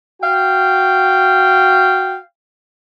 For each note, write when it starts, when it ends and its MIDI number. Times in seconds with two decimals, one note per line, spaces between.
0.22 2.17 66
0.22 2.17 77
0.22 2.17 79